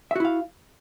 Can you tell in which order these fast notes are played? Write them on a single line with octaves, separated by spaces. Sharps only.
E5 F#4 E4 F5